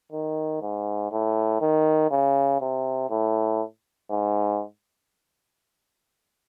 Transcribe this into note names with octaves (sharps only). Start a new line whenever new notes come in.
D#3
G#2
A2
D#3
C#3
C3
A2
G#2